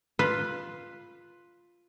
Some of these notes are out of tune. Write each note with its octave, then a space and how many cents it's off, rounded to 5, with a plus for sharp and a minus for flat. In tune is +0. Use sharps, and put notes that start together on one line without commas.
F4 +0 B4 +0